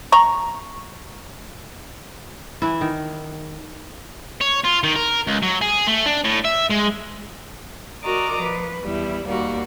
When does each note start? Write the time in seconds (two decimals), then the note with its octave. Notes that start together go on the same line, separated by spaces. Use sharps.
0.12 A#5 C#6
2.62 E3 E4
2.81 D#3
4.41 C#5
4.64 F4
4.83 D#3
4.96 A#4
5.27 C#2
5.42 F#3
5.62 G#4
5.87 A3
6.06 D4
6.25 A2
6.45 E5
6.70 G#3
8.04 F#4 A#4 D5 D#5 A#5 D6
8.40 F3 B4
8.83 E2 G3 E4
9.27 D#2 G3 A#3 F#4